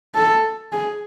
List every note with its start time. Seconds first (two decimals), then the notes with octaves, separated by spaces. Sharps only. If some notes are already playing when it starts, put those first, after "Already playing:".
0.15 A4
0.72 G#4